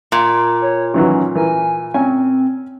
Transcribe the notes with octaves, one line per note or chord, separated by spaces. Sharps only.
A#2
C#5
D#3 E3 F#3 C#4
E3 A#4 G#5
C4 C#4 G#5